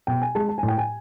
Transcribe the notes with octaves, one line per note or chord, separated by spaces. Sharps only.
B2 G5
G#5
G#3 A5
A5
A2 G#5
G5
G#5